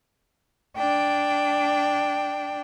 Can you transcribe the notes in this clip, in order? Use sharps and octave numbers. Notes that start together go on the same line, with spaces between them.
D4 G5